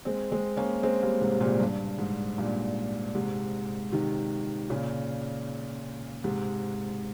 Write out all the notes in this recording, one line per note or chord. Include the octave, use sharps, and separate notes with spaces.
G#3 C4
G#3 C4
A#3 C#4
G#3 C4
G3 A#3
G#2 C3
A#2 C#3
G2
G#2
G2 A#2
G#2 C3
C3 D#3
A#2 C#3
G#2 C3